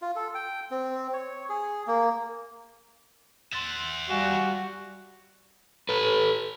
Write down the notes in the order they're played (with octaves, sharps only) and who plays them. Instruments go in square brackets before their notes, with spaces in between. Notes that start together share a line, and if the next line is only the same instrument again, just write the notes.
[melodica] F4
A4
G5
C4
C#5
G#4
A#3
[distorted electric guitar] E5 F#5 [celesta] C6 A6
[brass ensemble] G3 [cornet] F#4 [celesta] F5 G#5 E7
[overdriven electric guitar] A4 B4